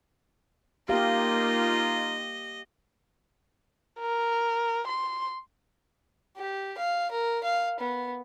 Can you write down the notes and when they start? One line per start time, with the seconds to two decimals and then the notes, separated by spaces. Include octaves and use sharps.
0.89 A#3 D#4 F4 G4 D#5 F5
4.00 A#4
4.88 C6
6.37 G4
6.78 F5
7.11 A#4
7.44 F5
7.80 B3